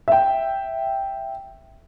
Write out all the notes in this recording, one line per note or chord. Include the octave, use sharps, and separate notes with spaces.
E5 G5